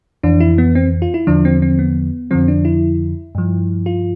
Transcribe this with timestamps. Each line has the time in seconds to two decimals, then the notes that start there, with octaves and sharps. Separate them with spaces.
0.23 F2 E3 D4
0.40 E4
0.58 B3
0.75 C4
1.02 F4
1.14 E4
1.27 E2 D3 F3 D4
1.45 C4
1.62 C4
1.79 B3
2.31 F2 D3 F3 C4
2.48 D4
2.65 E4
3.35 G2 F3
3.86 F4